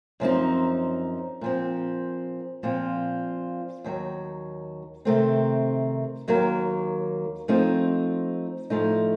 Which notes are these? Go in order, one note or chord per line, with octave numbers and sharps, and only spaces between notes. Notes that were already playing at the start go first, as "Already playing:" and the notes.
F#2 F3 C4 D#4
A#2 F3 C4
A#2 F3 C4 F4
D#2 D#3 F#3
C3 D#3 A3 C4
D#2 D#3 F#3 A#3
F3 A3 C4 D#4
A2 F3 A3 D#4